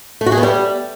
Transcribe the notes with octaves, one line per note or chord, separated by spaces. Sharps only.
A3
F#4
G#4
B3
G3